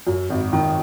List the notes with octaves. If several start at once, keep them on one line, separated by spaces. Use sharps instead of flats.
F#2
G#1
D#3